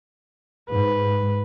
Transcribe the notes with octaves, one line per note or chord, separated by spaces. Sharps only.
G#2 B4